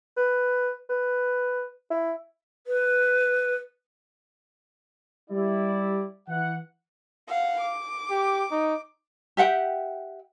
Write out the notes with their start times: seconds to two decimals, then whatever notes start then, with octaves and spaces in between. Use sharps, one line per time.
0.17 B4
0.90 B4
1.91 E4
2.67 B4
5.30 G3 E4 D5
6.28 E3 F#5
7.28 F5 F#5
7.61 D6
8.10 G4
8.51 D#4
9.37 G4 E5 F#5 G5